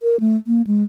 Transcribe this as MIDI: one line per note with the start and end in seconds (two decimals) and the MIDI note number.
0.03 0.19 70
0.20 0.36 57
0.47 0.62 58
0.67 0.83 56